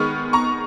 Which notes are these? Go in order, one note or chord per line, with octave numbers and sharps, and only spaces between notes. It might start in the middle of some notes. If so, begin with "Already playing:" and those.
Already playing: D#3 G#3 B3 C#6 F6
A#5 C#6